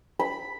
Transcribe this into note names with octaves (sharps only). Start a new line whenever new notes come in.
B5